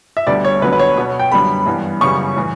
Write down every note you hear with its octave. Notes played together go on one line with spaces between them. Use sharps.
E5
D2 D3 G3 B3 D5
C#5
D2 D3 F#3 B3 B4
B4
C#5
B2 F#3 B3
G5
F#2 D3 G3 B3 B5
G2 E3 B3
F#2 C#3 G3 B3 C#6
A2 E3